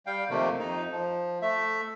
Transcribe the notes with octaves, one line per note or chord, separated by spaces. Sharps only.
G3 F5 G5
F2 C3 D#3 A3 A#3
F2 D#4
F3
A3 E5